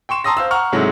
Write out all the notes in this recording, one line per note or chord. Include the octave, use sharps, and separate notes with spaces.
G5 C6 C#6 E7
A5 A#5 C6 D#6 E6 A#6
C5 F5 E6
F#5 A#5 C#6 F6
G#2 C3 F#3 G#3 A3 E4